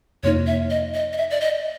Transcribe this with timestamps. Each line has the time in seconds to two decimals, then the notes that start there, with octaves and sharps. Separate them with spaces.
0.23 F2 C3 F3 A#3 D#4 C#5
0.47 E5
0.70 D#5
0.94 D#5
1.13 D#5
1.17 E5
1.30 D5
1.41 D#5